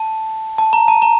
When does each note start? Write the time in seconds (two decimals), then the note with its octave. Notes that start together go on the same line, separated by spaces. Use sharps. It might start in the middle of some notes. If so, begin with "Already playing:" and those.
Already playing: A5
0.58 A5
0.73 A#5
0.88 A5
1.02 A#5